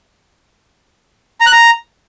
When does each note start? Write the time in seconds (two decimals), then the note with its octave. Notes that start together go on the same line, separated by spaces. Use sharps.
1.40 A#5
1.46 F#6
1.52 A#5